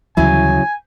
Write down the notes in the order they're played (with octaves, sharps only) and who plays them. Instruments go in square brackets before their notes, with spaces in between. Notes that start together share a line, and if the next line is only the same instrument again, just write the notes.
[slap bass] D2 E3 G3 [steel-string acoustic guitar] C#3 F#3 [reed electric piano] E4 [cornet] G#5